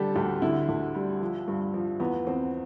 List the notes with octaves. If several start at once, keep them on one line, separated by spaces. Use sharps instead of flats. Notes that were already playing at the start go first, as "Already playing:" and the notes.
Already playing: D3 G3 G4 A4
D2 G4
D3 E4
D2
G3
F3
G2
F3
E2 B3
E2 C4